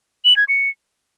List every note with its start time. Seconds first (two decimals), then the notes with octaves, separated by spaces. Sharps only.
0.25 F#7
0.37 G#6
0.49 C#7